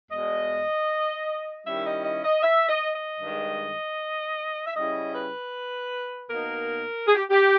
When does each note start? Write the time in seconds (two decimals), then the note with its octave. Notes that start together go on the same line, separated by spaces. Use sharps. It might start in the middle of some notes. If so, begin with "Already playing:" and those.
0.10 E2 B2 G#3 D#5
1.65 D#3 G3 C#4 E4 E5
1.85 D#5
2.04 D#5
2.24 D#5
2.43 E5
2.69 D#5
2.95 D#5
3.20 G2 D#3 G#3
4.66 E5
4.76 C#3 G3 C#4 E4 D#5
5.15 B4
6.30 B2 A#3 D#4 A#4
7.07 G#4
7.15 G4
7.30 G4